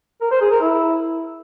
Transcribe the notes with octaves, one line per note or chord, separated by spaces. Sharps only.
A#4
C5
G#4
A#4
E4